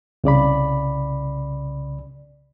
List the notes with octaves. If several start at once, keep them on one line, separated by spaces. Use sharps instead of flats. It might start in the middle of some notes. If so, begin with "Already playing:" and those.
C2 C#3 D5 B5